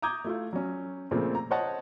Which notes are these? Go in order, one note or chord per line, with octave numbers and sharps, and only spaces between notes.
A#5 D6 D#6 G6 G#6
A3 E4 F4
F#3 C#4
A#2 C#3 F3 A3 C4
A#5
C5 C#5 D#5 F#5 A5